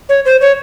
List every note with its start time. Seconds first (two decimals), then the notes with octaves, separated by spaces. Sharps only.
0.09 C#5
0.25 C5
0.41 C#5